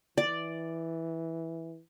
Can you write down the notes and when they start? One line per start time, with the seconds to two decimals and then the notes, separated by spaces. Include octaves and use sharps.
0.18 E3 D5